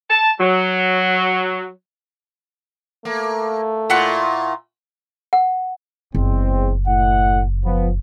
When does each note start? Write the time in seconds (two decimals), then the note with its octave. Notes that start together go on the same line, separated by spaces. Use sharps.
0.10 A5
0.41 F#3
3.05 A3 A#3
3.90 A#2 E4 F4 F#5 C#6
5.33 F#5
6.15 F#1 E2 G#3 C4
6.87 A2 F#5
7.65 F3 B3